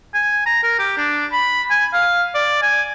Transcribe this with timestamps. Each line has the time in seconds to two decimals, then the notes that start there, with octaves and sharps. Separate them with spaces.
0.15 G#5
0.46 A#5
0.63 A#4
0.79 G4
0.98 D4
1.33 B5
1.71 G#5
1.94 F5
2.35 D5
2.62 G#5